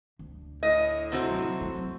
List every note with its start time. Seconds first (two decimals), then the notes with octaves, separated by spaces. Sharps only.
0.19 D2
0.63 A2 D#5
1.12 C3 C4 F#4
1.29 F#3
1.60 F#3 A3